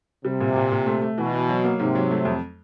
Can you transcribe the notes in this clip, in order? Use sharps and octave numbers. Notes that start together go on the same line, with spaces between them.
C3 G3
A#2
A#2
A#2
A3
A3
B2 E3
E3
F#3
A#3
G#2 C3
F#3
A3
F2